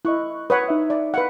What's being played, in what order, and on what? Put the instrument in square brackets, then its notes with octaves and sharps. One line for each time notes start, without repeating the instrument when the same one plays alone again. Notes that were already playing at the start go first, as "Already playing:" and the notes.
[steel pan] E4 [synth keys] D#5 C#6 F#6
[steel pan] B4 C#5 F#5 [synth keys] D#6
[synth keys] D#4 E5
[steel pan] D5
B4 F5 F#5